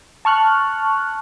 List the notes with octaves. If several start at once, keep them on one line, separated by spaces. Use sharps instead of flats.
A5 C#6 F6 F#6